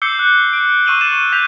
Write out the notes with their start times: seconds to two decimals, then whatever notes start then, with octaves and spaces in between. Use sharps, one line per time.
0.02 D6 E6 G6 C7 C#7 G7
0.19 F#6
0.53 D7
0.85 C#6 E6 D#7 E7 F#7 G7
1.01 A6 D#7 E7
1.32 G6 B6 E7 F7